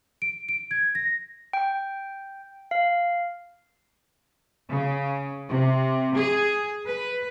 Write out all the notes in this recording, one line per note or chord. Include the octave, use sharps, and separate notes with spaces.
D7
D7
G#6
A#6
G5
F5
C#3
C3
G#4
B4